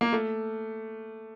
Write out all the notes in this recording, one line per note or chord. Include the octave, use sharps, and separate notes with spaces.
A#3
A3